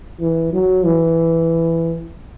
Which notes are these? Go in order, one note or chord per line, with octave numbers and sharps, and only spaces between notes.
E3
F#3
E3